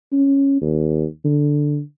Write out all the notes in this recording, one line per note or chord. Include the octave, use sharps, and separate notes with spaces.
C#4
D#2
D3